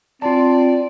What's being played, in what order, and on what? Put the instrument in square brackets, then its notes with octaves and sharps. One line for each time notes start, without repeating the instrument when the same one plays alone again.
[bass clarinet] C4 [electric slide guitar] F4 A5 [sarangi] D5